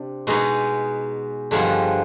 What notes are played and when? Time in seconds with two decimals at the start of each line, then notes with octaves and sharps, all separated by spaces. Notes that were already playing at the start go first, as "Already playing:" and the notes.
Already playing: C3 D4
0.27 B2 G#3 B3 D#4
1.51 G2 D3 F3 G#3 B3